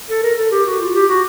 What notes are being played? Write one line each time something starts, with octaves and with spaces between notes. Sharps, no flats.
A4
A#4
A4
G4
F#4
F4
G4
F#4